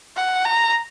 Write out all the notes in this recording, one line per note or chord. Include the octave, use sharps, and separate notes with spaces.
F#5
A#5